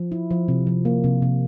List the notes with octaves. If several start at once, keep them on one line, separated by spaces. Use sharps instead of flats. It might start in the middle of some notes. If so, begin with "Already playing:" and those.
Already playing: F3
E4
F3
C3
F3
A#3
C3
C3